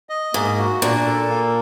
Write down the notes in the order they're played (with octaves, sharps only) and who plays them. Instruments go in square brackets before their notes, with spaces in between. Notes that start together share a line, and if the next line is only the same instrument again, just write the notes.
[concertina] D#5
[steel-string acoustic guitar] G#2 [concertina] A#3
[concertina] F#4
[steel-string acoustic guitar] A#2 [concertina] D4
[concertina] A4
A#3